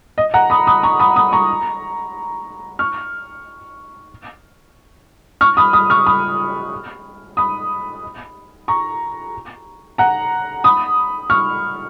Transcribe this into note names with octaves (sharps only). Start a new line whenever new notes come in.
D#5
F#5 A#5
B5 D#6
B5 D#6
A#5 C#6
B5 D#6
B5 D#6
A#5 C#6
C#6 F6
C#6 F6
B5 D#6
B5 D#6
C#6 F6
B5 D#6
B5 D#6
A#5 C#6
F#5 A#5
B5 D#6
C#6 F6